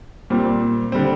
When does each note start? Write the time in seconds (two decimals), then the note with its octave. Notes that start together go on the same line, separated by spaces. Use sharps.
0.30 A#2 G3 C4
0.92 D3 G3 C4